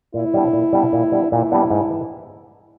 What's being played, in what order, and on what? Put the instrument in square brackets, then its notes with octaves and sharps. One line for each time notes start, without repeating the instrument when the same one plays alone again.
[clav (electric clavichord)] A#2 [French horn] E4
[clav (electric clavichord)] G3 B3 D4
A#2
G3 B3 D4
A#2
G3 B3 D4
[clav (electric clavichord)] A#2 [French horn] E4
[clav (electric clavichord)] G3 B3 D4
G#2
E3